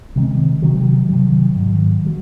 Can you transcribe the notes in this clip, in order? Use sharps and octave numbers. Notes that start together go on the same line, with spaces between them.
C3 D#3 G#3 C4
C3 D#3 F#3
C3 D#3 F#3
G#2 D#3 F#3
D#3 F#3